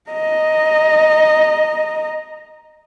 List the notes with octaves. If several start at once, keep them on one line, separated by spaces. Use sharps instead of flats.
D#5 A#5